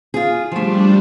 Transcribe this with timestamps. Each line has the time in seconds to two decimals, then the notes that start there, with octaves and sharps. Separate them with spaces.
0.14 F4 G#4
0.52 F3 G3 A3 D4